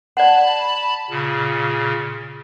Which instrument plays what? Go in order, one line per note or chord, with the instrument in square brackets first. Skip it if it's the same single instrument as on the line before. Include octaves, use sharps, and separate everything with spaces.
[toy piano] D5 F#5 [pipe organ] A5 B5
[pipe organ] A#2 C#3